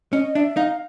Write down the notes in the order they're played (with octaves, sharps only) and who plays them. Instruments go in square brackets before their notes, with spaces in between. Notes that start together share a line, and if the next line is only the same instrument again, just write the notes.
[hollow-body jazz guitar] C#4 [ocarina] D#5
[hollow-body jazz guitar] D4 [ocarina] E5
[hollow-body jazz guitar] D#4 [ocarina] F5